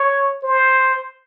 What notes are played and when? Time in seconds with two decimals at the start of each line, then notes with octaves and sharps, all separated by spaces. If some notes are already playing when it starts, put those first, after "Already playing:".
Already playing: C#5
0.43 C5